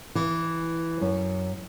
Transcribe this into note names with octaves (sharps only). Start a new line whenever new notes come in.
E3
F#2